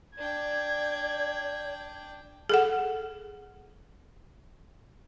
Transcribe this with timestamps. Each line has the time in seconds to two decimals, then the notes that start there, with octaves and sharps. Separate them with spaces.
0.18 D4 D5 G5 G#6
2.49 G#4 A4 F#5